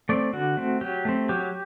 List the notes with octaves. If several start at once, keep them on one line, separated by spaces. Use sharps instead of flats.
A3 C4 D5
D3 F#4
A3 C4
F#3 G4
A3 C4
F#3 G4